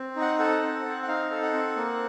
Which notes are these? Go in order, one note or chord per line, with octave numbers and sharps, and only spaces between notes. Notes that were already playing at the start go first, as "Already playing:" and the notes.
Already playing: C4
D#4
F#5
A4 F#5
C4
C4
F#5
D#4 F5
A4
F#5
C4
A#3